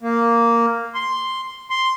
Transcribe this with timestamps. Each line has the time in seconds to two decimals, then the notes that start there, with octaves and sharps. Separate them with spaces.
0.01 A#3
0.95 C6
1.70 C6